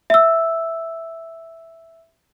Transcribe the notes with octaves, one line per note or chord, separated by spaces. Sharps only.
E5 E6